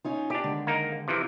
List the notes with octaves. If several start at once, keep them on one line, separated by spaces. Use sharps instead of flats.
C#4 D#4 F4
D4 G4 D#5
D3 D#3 G#3
A#3 D#4 A#4
C3 E3 F3